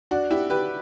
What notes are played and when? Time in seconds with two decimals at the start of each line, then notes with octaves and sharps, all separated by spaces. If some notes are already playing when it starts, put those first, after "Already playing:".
0.11 D4 F#4
0.31 E4 G4
0.50 G4 B4